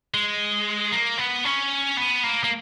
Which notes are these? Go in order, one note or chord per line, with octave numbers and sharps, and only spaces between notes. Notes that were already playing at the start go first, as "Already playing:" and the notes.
G#3
A#3
B3
C#4
B3
A#3
A#3